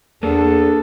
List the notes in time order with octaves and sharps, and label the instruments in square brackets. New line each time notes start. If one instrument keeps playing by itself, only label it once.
[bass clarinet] E2 [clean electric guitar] A#3 B3 [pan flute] D4 [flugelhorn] A4